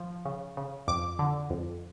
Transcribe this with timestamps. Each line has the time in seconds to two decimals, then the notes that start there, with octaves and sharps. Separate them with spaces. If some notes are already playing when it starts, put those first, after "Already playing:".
Already playing: F3
0.25 C#3
0.57 C#3
0.88 F2 D6
1.19 D3
1.50 F2